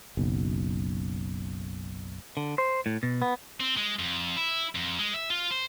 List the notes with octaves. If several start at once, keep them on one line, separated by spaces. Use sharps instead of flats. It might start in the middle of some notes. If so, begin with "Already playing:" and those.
F#1 B1
D3
C5
A2
B2
B3
C4
G#3
F2
E4
F2
G#3
E5
F4
C5